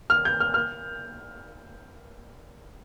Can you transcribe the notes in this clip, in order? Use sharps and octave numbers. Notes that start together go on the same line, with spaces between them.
F6
G6
F6
F6